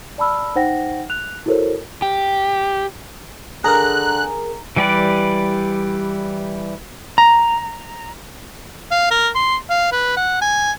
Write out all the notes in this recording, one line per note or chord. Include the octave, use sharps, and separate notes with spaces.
D5 A5 B5 E6 F6
D#4 C5 F#5 G5 A#6
F#6 F7
E4 F#4 A4 A#4 C5 C#5
G4
D3 G#4 A#4 A#5 F#6
E3 G3 G4 B4 D5
A#5
F5
A#4
C6
F5
B4
F#5
G#5